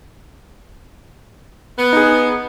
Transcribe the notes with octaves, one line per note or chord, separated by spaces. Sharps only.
B3
D#4 G#4